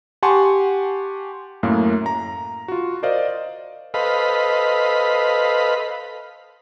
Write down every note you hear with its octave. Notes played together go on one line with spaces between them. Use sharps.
G4 F#5 G#5 A5 C6 C#6
F#2 A2 A#3 F5
A#5
F4 F#4
A#4 C5 D5 D#5 F5
A4 B4 C5 D#5 F5 B5